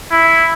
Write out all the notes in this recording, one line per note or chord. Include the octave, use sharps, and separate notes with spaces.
E4